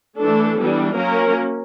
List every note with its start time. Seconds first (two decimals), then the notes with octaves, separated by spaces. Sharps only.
0.20 E3 A3 D4 A4
0.59 E3 G3 B3 D4
0.97 F#3 A#3 C#4 A#4